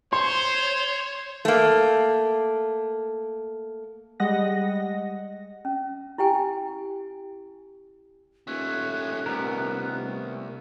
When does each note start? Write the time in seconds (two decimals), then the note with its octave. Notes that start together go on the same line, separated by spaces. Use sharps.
0.13 C5 C#5 C6
1.45 A3 A#3
4.20 G3 G#3 D#5 F#5 A#6
5.65 C#4
6.18 E4 G4 G5 G#5
8.47 D#1 A3 C#4 F#6
9.26 C2 A3 B3 A#4